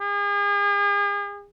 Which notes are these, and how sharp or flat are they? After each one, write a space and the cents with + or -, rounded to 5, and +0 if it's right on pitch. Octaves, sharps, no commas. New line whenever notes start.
G#4 -40